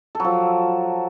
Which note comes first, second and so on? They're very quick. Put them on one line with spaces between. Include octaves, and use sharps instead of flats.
A4 F#3 F3